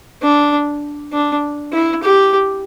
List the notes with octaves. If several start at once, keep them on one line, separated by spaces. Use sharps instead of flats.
D4
D4
E4
G4